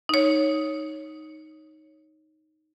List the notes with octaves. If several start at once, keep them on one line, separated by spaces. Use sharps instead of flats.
D#4 C#5